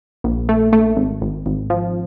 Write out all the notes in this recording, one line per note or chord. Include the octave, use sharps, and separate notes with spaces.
A#1
A3
A3
G#1
G#1
G#1
F3